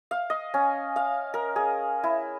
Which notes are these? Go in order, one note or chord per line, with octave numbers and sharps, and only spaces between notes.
F5
D#5
C#4
F5
A#4
G#4
E4